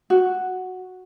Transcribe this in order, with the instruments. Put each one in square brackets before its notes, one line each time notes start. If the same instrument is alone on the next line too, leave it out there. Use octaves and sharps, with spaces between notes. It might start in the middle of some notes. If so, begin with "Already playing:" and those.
[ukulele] F#4